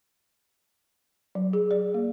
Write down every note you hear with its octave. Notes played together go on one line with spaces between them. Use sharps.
F#3
G#4
D5
A#3